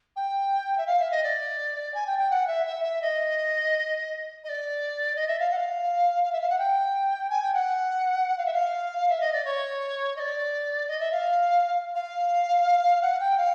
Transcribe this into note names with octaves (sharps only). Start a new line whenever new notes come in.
G5
E5
F5
E5
D#5
D5
G#5
G5
G5
F#5
E5
E5
E5
D#5
D#5
D5
D#5
E5
F5
F#5
F5
F5
E5
F5
F#5
G5
G#5
G5
F#5
F5
E5
F5
E5
D#5
D5
C#5
D#5
D5
D#5
E5
F5
F5
F#5
G5
F5